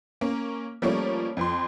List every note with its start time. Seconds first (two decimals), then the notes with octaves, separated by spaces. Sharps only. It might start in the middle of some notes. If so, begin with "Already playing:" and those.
0.21 A#3 C#4
0.82 F3 G3 A3 A#3 C#4 C#5
1.37 F2 F3 C6